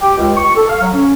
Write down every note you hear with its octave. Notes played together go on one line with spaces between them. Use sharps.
G4
C#2
C#6
A4
F5
F#3
C#4